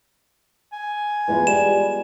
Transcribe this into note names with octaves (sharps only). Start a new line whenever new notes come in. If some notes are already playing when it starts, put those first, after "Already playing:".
G#5
E2 G#3 B3 F4
G3 E7